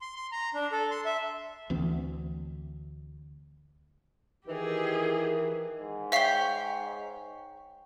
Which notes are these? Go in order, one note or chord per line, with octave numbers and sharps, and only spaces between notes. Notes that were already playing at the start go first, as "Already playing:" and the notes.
C6
C6
A#5
D4
A4
C6
E5
D2 E3 C4
D#3 E3 G4 G#4
G#2
C#5 E5 F5 G5 C7